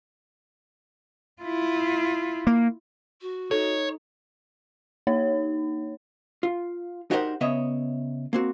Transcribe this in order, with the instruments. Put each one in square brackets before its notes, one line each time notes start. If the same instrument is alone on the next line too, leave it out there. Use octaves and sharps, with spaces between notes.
[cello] E4 F4
[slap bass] A#3
[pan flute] F#4
[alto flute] D#4 [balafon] A4 [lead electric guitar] C#5
[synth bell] A#3 D#4 C#5
[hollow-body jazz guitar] F4
D#4 F#4 G4 A#4 C5 F#5
C#3 B3 C#5 D#5 E5
A#3 C4 F#4